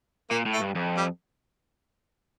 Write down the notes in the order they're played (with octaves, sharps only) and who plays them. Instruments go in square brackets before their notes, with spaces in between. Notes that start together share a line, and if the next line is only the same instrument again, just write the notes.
[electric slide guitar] A#2 [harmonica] A#3
[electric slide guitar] A2
[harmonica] A3
[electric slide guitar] G2
F2
[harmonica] G3